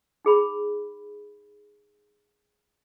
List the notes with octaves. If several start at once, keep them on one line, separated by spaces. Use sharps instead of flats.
D#4 G#4 B5